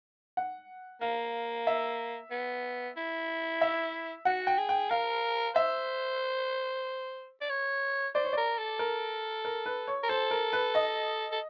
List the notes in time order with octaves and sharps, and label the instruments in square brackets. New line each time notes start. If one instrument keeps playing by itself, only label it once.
[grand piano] F#5
[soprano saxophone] A#3 [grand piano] F5
[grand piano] E5
[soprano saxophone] B3
E4
[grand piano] E5
[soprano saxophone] F#4 [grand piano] F#5
[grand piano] G5
[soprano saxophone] G#4
[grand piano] G5
[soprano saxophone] A#4 [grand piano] F5
[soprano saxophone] C5 [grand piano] E5
[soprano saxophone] D5
C#5
[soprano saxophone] C5 [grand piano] D5
[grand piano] C#5
[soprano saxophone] A#4 [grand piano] D5
[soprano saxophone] A4
[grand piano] A#4
A#4
B4
C#5
[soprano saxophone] A#4
[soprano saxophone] A4 [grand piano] C5
[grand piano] A#4
B4
D#5
[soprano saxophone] A4